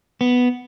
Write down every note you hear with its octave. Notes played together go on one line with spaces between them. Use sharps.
B3